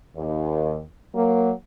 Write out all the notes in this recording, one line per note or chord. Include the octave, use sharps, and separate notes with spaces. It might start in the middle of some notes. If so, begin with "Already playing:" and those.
D#2
F#3 A#3